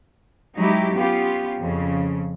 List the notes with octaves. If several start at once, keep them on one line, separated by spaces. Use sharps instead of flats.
F#3 G#3 D#4 E4 G4
B3 C#4 F4 G4
F2 C#3